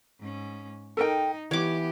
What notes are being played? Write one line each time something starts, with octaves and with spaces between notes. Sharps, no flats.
G#2 C#4
D#4 A4 A#4 G5
E3 B3 G4 C#5 D6